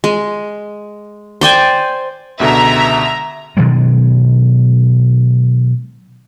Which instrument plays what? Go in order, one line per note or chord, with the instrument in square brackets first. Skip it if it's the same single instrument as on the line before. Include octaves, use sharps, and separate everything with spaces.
[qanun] G#3
C5 D5 G5 G#5
[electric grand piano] C#2 B2 D3 [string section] E5 A#5
[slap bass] B2 D#3 F#3 G#3